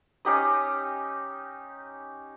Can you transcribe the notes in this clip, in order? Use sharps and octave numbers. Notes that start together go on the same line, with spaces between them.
C#4 D#4 G4 D#6